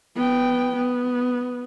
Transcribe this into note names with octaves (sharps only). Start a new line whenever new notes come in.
B3 G5
B3